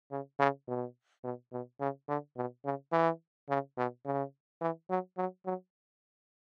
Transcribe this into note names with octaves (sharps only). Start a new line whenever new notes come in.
C#3
C#3
B2
B2
B2
C#3
D3
B2
C#3
E3
C#3
B2
C#3
E3
F#3
F#3
F#3